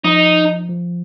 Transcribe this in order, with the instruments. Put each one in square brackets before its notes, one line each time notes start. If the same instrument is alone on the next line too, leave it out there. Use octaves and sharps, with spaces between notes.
[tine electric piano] F3 [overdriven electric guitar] D#4
[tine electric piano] F3